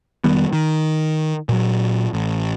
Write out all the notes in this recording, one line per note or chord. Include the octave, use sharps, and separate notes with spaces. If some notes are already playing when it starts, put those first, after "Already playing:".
F1 D#3 G3 B3
D#3
A#2 F#3
A1